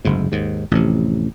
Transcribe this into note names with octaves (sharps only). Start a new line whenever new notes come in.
F#1 D2 G#2
D#2 G#2
A1 F2 C3